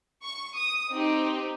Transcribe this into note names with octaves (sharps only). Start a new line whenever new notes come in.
C#6
D#6
C4 D#4 G4